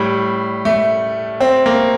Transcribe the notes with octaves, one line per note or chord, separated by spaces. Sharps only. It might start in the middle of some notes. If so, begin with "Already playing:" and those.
Already playing: A2 G3
A3
C4
A#3